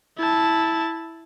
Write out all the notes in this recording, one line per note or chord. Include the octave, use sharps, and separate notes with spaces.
E4 A5